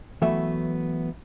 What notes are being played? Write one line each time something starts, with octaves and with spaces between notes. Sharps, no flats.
E3 F#3 A3 B3 E5